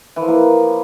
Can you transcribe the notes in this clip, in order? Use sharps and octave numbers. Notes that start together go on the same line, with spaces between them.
E3
F3
A#3